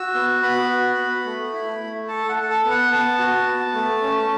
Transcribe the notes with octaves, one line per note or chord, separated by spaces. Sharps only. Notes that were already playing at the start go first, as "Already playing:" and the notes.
Already playing: F#4 E6
B3
B3 B5
F#4
B3
A3
E4
A3
A4 A5
F#5
A4
A5
B3
F#5
B3 A5
F#4
B3
A3
C#4